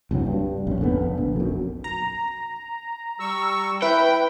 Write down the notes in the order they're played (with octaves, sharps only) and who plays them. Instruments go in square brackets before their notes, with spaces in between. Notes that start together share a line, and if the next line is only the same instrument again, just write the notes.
[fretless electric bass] F#1 C2 G2 F#3
G2
A#1 C#4
F1 D3 B3
A#1
B1 F#2
[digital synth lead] A#5
[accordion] G3 C#6 E6
[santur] E4 [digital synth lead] B4 [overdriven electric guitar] G5 [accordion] B5